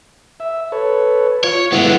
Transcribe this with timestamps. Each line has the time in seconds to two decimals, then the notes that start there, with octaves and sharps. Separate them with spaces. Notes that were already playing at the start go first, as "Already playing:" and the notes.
0.40 E5
0.72 A4 B4 C#5
1.44 F4 C#5
1.72 D3 F#3 G#3 B3 E4